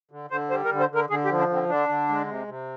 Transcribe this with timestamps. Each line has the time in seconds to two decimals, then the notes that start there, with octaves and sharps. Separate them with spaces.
0.11 D3
0.30 D3 C5
0.50 G3 C5
0.65 A#4
0.71 D3
0.80 C5
0.90 D3
0.95 A#4
1.10 D3 G#4
1.25 G4
1.29 F3
1.39 D4
1.49 D3 C4
1.69 D3 D4
1.89 D3
2.09 G#3
2.27 C3
2.48 C3